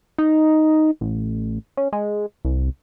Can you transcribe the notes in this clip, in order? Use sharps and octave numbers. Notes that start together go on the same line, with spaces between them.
D#4
A1
C#4
G#3
C2